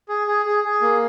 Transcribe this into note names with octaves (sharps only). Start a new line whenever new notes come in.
G#4
G#4
G#4
G#4
A#3